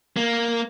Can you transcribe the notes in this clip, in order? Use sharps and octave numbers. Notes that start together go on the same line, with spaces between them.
A#3